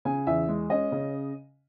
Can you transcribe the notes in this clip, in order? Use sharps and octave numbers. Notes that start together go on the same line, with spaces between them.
C#3 G#5
E2 E5
G#3
C#4 D#5
C#3